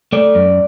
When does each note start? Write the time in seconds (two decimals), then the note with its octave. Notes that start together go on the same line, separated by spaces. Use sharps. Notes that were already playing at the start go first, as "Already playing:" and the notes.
0.13 A3 D5
0.35 F#2